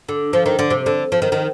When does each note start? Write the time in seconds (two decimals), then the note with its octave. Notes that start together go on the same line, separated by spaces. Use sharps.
0.09 D3
0.33 F3
0.46 D#3
0.59 D3
0.70 C3
0.86 D3
1.12 F3
1.22 D#3
1.32 D#3